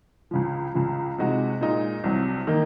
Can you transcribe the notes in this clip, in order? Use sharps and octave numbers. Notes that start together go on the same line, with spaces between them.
C#2 C#3 F3
C#2 C#3 F3
C3 F3 G#3 D#4 F#4
A#2 G#3 D#4
C2 C3 F#3
D#3 A#3 D#4